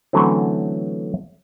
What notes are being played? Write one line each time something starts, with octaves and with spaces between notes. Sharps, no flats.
D3 E3 F#3 A3 C4 C#4